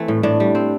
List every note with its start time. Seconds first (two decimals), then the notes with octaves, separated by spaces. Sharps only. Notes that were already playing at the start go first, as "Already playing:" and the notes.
Already playing: E3 A3 C4
0.08 A2
0.23 A2 D4
0.40 G3
0.55 C4